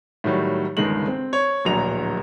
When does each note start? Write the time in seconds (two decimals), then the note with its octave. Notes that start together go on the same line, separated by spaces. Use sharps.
0.24 A2 D#3 F#3 G3
0.77 G1 C#2 D#3 G#3 F#7
1.08 C4
1.33 C#5
1.65 D1 A#1 F#3 A#5 F7